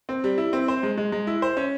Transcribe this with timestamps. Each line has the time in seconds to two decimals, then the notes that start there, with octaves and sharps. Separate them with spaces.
0.09 C4
0.24 G3
0.38 E4
0.53 C4
0.68 C5
0.83 G#3
0.98 G#3
1.12 G#3
1.27 E4
1.42 C5
1.57 C#4